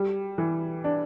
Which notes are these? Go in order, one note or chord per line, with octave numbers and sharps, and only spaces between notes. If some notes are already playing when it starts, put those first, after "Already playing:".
Already playing: G3
E3
D4